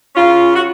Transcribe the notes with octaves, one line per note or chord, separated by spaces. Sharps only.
C#3 C#4 F4
F#4